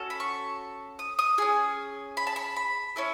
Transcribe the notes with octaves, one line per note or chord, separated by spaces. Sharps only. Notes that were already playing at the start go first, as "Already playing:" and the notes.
Already playing: C#4 F#4 A4
B5
C#6
D#6
D#6
C#4 G#4
B5
A5
B5
B5
C#4 E4 A4